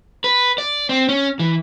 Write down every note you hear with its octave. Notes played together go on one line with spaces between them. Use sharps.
B4
D5
C4
C#4
E3